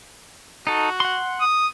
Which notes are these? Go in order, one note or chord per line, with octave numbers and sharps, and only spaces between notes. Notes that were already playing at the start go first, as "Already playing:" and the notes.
D#4 F#4 A4
F#5 C6
D#6